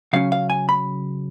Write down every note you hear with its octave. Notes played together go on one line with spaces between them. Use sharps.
C#3 F#3 C#4 F5
F5
G#5
B5